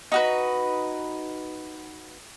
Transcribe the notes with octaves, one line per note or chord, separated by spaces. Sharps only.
D#4 F#4 B4